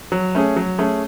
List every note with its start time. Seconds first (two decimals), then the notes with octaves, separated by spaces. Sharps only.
0.12 F#3
0.35 A3 C#4 G#4
0.56 F#3
0.78 A3 C#4 G#4